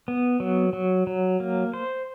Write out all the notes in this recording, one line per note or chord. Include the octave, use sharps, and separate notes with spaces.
B3
F#3
F#3
F#3
A#3
C5